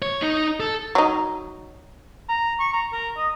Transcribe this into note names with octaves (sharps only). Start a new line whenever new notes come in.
C#5
D#4
A4
F#3 D#4
A#5
C#6
A#5
A#4
D#5